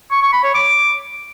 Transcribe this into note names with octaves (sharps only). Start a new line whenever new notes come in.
C#6
C#6
B5
C#5
D6